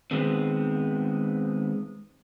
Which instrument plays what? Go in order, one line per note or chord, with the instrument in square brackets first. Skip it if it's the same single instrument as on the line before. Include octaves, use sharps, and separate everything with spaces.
[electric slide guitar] D#3 G#3 B3 C4